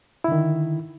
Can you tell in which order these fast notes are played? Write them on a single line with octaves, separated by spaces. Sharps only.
E4 D3 D#3